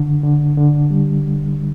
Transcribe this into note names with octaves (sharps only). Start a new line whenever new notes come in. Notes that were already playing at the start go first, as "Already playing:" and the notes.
Already playing: D3
D3
D3
G3